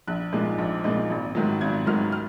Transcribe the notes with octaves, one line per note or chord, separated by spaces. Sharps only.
A#1 F#6
A#2 G#3 D#4
A#1
A#2 G#3 D#4
G#1
G#2 D#3 F#3
G#1 G#6
G#2 D#3 F#3 F6
F6